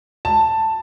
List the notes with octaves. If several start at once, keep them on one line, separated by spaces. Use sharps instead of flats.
A5